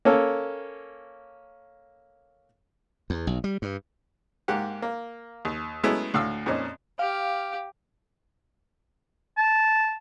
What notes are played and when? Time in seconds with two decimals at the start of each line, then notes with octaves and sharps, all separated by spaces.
0.05 A#3 C#4 A4
3.10 E2
3.27 B1
3.44 G3
3.62 G2
4.48 G#2 A#3 G4 F#5
4.82 A#3
5.45 D#2
5.83 F#3 G#3 A3 B3 C#4 E4
6.14 D2 A2 F5 E6
6.46 F2 A#2 C4 C#4 D#4
6.99 G4 F5
9.38 A5